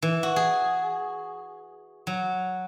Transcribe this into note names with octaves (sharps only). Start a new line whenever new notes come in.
E3
F#4
G#4
F#3